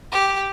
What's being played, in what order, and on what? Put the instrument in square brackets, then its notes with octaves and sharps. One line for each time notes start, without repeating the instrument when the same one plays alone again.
[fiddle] G4